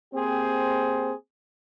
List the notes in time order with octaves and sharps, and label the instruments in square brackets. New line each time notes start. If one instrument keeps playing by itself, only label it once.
[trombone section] A#3 C4 G4 G#4 C5